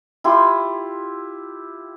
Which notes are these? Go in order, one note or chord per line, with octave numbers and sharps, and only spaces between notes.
E4 F4 G4 C6